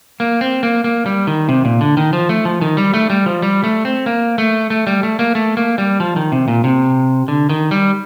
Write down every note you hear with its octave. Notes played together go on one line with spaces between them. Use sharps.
A#3
C4
A#3
A#3
G3
D#3
C3
A#2
D3
D#3
F3
A3
F3
D#3
G3
A3
G3
F3
G3
A3
C4
A#3
A3
A3
G3
A3
A#3
A3
A#3
G3
F3
D#3
C3
A#2
C3
D3
D#3
G3